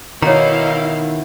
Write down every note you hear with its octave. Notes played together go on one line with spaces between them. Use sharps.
B2 D#3 E3 D#4 E4 C#5 F5 A#5